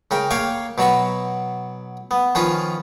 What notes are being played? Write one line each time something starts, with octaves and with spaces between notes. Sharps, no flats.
C#3 A#4 G5
A#3 C#5 F5 G5 C#6
B2 F#3 A#5 B5 C#6
B3
D#3 F3 C#4 F4 B4